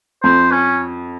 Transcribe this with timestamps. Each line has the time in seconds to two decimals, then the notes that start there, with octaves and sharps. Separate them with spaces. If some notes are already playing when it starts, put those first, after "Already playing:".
0.23 F2 C5
0.51 C#4